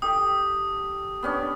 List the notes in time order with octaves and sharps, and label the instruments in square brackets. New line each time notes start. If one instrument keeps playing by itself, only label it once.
[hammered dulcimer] G4 A4 [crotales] D#6
[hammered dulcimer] B3 C#4 D4